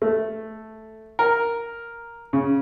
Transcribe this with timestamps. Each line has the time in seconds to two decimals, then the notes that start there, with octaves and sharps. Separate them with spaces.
0.02 A3
1.19 A#4
2.33 C#3